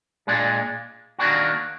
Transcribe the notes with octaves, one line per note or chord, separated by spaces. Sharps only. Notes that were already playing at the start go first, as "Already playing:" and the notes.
A#2 G#3 D4
D#3 A#3 D4 F#4